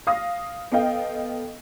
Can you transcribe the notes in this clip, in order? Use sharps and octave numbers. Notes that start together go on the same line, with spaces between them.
F5 D#6 A#6
B3 A4 D#5 F5 G5